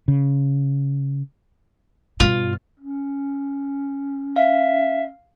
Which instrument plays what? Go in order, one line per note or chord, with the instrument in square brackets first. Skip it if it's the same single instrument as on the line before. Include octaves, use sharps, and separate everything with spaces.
[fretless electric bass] C#3
[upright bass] G2 B2 [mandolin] F4
[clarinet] C#4
[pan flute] E5 [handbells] F5